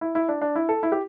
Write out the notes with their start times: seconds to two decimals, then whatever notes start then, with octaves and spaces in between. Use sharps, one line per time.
0.01 E4
0.15 E4
0.28 D4
0.41 D4
0.55 E4
0.69 A4
0.83 E4
0.92 G4